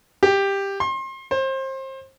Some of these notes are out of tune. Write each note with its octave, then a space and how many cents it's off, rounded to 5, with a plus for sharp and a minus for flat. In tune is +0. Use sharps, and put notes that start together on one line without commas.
G4 +10
C6 +35
C5 +30